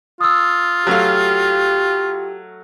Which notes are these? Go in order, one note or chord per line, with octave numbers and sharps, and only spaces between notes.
F4 D#6 E6
F#3 A3 G4 F5